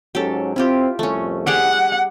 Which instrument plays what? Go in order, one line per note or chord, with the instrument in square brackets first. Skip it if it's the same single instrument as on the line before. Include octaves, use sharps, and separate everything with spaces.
[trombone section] G#2 F#3 C#4 [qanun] G4 A4
[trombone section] C4 [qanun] E4 F4 G4
[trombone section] C2 F2 [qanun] A3 C#4
[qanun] G3 G4 G#4 [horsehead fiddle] F#5